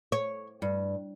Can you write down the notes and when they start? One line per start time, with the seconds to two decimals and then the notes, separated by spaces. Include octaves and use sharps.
0.12 C#5
0.62 G2